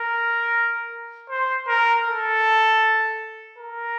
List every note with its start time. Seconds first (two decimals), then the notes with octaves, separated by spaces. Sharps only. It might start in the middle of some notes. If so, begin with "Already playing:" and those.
Already playing: A#4
1.30 C5
1.68 A#4
2.06 A4
3.58 A#4